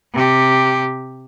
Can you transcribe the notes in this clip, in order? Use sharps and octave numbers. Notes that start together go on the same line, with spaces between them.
C3 G4